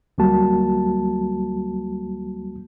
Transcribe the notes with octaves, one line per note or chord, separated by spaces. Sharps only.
D2 F#3 G3 A#3 F#4 A5